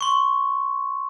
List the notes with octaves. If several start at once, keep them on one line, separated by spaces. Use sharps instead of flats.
C6 C#6